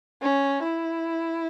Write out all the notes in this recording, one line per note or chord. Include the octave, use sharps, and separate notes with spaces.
C#4
E4